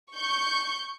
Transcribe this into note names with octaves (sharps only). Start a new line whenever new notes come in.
C#6 G6